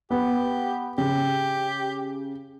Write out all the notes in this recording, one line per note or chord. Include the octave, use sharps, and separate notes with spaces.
B3 G4
C#3 G4